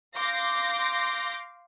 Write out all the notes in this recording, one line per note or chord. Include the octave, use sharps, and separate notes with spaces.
F5 C6 D6 G6 A#6